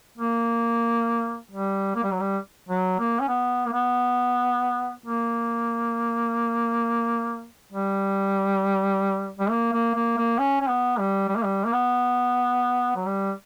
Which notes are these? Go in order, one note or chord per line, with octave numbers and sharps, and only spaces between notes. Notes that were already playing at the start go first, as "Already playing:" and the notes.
A#3
G3
A#3
G3
F#3
G3
F#3
A#3
C#4
B3
A#3
B3
A#3
G3
G3
A#3
A#3
A#3
A#3
C#4
C#4
B3
G3
G3
A#3
G3
A#3
B3
F#3
G3